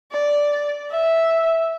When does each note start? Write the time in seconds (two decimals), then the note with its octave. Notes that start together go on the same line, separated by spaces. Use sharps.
0.12 D5
0.91 E5